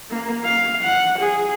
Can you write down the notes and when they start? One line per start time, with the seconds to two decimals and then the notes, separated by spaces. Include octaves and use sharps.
0.11 A#3
0.45 F5
0.83 F#5
1.19 G#4